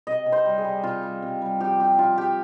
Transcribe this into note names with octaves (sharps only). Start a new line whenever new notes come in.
C3 D#5
C3
C5
G3
G#4
G3
C3 F4
G3
C3
G3
F3 G4
C4 G4
F3 F4
F3 G4